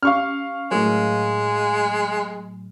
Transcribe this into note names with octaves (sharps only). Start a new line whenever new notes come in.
C#4 G4 F5 C#6 D6 F6
A2 F#3 G#3 A#4 C#5